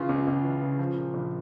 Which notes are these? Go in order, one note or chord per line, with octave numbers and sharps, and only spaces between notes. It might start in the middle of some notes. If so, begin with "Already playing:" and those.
Already playing: C#3 E3 F4
C#2
C#2
E3
C#3
F3
A#2
A#1